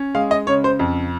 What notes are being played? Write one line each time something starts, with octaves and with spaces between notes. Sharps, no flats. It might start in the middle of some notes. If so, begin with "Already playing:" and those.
Already playing: C#4
G#3 F5
D#5
C#3 C#5
C5
F2